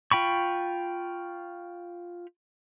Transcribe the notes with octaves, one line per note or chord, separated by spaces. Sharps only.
F4 G5 B5 C#6